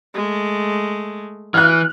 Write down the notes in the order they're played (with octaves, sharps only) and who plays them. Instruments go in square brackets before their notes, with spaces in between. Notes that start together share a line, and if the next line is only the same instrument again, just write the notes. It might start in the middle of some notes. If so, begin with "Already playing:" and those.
[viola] G#3 A3
[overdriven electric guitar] E3 [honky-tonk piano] F6 F#6